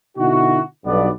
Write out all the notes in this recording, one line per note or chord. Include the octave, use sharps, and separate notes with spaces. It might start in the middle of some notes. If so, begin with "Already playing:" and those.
B2 D3 D#4 E4 F#4
B1 G2 B3 D5